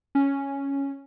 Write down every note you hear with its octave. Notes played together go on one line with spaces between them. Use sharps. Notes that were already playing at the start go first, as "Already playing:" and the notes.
C#4